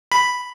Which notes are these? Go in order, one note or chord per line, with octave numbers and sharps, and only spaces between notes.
B5